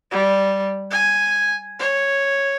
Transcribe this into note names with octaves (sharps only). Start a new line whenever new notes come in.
G3
G#5
C#5